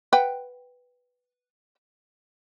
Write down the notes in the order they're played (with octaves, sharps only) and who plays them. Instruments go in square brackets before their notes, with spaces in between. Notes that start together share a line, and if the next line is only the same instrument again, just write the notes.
[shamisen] B4 F#5 G5